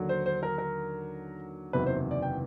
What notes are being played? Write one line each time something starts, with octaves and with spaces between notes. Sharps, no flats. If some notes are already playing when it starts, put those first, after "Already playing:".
Already playing: D#2 D3 F#3
C5
C5
A#4
A#4
F#1 E2 C3 D#3 F#3 B4
C5
D5
G5